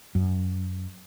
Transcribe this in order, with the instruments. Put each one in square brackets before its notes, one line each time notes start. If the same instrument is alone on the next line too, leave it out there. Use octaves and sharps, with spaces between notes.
[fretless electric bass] F#2